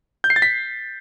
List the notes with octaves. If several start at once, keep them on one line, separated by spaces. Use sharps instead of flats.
G6
C7
A6
B6